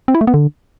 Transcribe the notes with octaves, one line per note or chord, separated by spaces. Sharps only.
C4
E4
A3
B3
D3